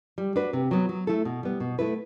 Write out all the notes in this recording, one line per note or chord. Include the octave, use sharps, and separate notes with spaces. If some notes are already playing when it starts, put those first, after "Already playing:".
G3
D4 F#4 B4
C3
F#3 B3
F#3
A3 E4 A4
B2
G3 B3
B2
A3 E4 B4